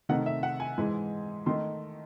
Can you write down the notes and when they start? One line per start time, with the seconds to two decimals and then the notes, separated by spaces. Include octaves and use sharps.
0.09 C3 D#3 A3 D#4 F#5
0.26 E5
0.43 F#5
0.60 G#5
0.78 G#2 E3 G#3
1.46 D#3 A3 D#4 C6